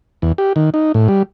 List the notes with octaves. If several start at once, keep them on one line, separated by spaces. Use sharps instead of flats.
E2
G4
D#3
D#4
A2
G3